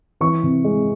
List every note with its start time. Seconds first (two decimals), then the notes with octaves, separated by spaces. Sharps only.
0.21 E3 C#6
0.43 C3
0.64 G#3